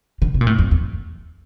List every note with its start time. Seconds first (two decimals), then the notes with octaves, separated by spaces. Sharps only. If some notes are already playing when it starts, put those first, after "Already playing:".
0.22 D3
0.34 C3
0.41 A#2
0.47 A2
0.59 F2
0.71 E2